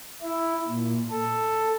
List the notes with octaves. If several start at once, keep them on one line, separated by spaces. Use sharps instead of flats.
E4
A#2
A4